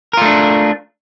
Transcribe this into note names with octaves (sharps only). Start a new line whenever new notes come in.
A3 D4 F4 A#4